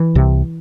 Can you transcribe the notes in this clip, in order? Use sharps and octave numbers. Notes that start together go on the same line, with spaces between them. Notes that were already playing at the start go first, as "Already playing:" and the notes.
Already playing: E3
C2 C3